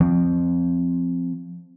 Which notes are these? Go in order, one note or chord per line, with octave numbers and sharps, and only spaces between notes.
F3 C4